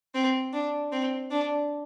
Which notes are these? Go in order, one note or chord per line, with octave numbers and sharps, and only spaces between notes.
C4
D4
C4
D4